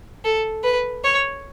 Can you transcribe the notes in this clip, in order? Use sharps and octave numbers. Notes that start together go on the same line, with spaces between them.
A4
B4
C#5